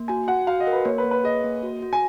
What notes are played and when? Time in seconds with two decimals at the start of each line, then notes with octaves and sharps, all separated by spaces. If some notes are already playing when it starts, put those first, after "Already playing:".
Already playing: A#3
0.08 F#4 G#5
0.28 F#4 F#5
0.47 F#4 F5
0.60 D#5
0.67 A#4
0.73 B4
0.85 A#3 C#5
0.98 B4
1.04 A#3
1.11 B4
1.24 G#4 D#5
1.44 A#3
1.63 F#4
1.82 F#4
1.93 G#5